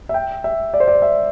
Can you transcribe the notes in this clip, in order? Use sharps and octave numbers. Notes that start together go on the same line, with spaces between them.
E5
G5
E5
D5
C5
D5
E5